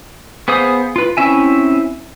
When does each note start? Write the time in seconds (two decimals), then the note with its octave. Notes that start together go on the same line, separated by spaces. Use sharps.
0.48 B3 G#4 C5 F5 D#6
0.96 F4 B4
1.17 C4 C#4 E4 E5 G#5